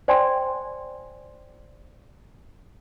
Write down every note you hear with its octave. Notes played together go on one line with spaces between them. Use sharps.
C5 D5 G5 G#5 C6